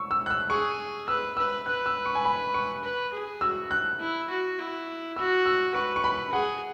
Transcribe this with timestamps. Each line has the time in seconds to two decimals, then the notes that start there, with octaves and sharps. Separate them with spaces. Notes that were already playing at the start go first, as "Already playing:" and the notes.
Already playing: C#6 E6
0.11 E6
0.26 F#6
0.30 E6
0.50 G#4 C#6
1.08 B4 E6
1.37 B4 E6
1.66 B4 F#6
1.86 E6
2.06 C#6
2.15 G#5
2.25 B5
2.54 C#6
2.84 B4
3.13 G#4
3.41 F#4 E6
3.71 F#6
3.99 E4
4.29 F#4
4.59 E4
5.16 F#4 E6
5.46 E6
5.75 B4 C#6
5.96 C#6
6.04 B5
6.33 G#4 F#5